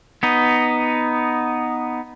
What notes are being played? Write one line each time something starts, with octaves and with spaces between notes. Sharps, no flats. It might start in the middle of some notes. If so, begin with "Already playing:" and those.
B3 D#4